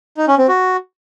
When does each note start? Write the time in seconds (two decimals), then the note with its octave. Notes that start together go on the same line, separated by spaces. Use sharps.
0.17 D#4
0.28 C#4
0.38 C4
0.48 F#4